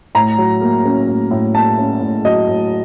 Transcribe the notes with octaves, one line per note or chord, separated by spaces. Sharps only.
A2 A#5
F#3
A#3
C#4
A2
A2
A#3 A5
C#4
A2
F#3 D#5
A2